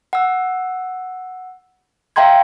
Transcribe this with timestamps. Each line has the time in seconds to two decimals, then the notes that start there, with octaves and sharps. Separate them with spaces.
0.13 F#5 E6
2.16 E5 F5 G5 A#5 C6 G#6